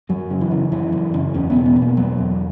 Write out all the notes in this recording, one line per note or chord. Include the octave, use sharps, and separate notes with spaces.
F#2 F#3
C#3
E3
C#3
F#2 E3
F#2
C#3
E2 C#4
B3
B2
B3
B2
A#3
E2 F#3
E2